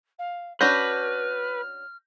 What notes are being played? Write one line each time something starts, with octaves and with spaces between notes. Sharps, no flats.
F5
C#4 D4 F#4 B4 F6 G6 A#6